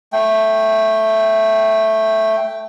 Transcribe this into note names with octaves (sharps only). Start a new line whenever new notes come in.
A3 G5